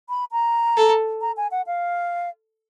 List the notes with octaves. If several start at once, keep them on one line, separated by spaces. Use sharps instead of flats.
B5
A#5
A4
A#5
G#5
F#5
F5